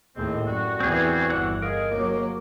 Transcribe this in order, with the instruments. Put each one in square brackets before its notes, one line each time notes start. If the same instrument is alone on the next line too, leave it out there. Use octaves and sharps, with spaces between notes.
[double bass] D#2 A2 [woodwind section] G#3 C4
[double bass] F#2 [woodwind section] D3 G3 F#4
[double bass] E2 E3 [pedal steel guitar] C4 G#4
[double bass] G1 [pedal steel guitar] E3 F#5 F#6
[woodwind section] D#4 F4 G#4 [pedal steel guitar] A#4
[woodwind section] D#2 C#3 D6 [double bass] F#3 A#3